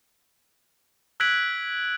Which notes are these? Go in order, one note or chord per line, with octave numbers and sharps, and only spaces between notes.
E6 F#6 G#6 B6 D7 F#7